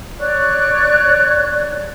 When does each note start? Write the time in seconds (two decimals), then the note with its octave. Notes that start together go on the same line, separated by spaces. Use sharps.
0.20 C#5 D5 C#6 F#6